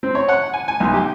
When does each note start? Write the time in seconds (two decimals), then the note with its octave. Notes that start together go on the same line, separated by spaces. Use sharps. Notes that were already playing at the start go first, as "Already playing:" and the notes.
0.03 C4
0.15 C#5
0.29 F#5
0.53 G#5
0.68 G#5
0.80 B1
0.94 G4